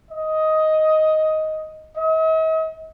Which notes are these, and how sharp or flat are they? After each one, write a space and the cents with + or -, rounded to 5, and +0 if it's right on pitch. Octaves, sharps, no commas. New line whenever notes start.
D#5 +10
D#5 +45